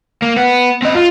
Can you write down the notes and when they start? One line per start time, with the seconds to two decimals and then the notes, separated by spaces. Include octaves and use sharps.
0.22 A#3
0.37 B3
0.82 C4 D#5
0.95 F4